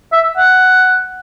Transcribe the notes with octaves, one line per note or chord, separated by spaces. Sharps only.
E5
F#5